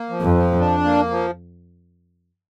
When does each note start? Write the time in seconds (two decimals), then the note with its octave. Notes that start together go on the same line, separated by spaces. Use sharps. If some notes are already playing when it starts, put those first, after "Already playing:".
Already playing: A#3
0.10 F3
0.21 F2
0.34 F3
0.59 D4
0.84 A#3
1.10 F3